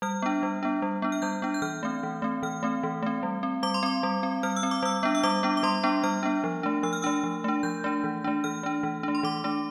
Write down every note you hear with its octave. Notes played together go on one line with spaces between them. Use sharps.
G3 F6
B3 D4
G3
B3 D4
G3
B3 D4
F6
G3 G6
B3 D4
G6
E3 F6
A3 C4
E3
A3 C4
E3 F6
A3 C4
E3
A3 C4
G3
C4
G3 D6
C6
C4 D6
G3
C4
G3 F6
E6
C4
D6
G3 E6
B3 D4
E6
G3 D6
B3 D4
D6
G3 C6
B3 D4
G3 F6
B3 D4
F3
A3 D4
F3 E6
F6
A3 D4 E6
F3
A3 D4
F3 G6
A3 D4
E3
A3 D4
E3 F6
A3 D4
E3
A3 D4
C6
E3 D6
A3 D4